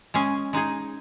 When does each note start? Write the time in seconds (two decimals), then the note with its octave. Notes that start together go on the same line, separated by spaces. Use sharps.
0.14 G#3 C#4 G#4
0.53 G#3 D#4 G#4